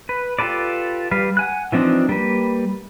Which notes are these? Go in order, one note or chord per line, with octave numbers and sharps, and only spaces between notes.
B4
F4 G4 A4 B4 D5
G3 B4 F5
F#5 G#5 F#6
E3 F3 C4 D4 D#4
G3 A#3 B4